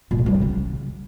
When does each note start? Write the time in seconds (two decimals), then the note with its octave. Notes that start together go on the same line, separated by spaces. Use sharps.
0.11 A#2
0.19 A3
0.26 G3
0.34 C3
0.41 C#3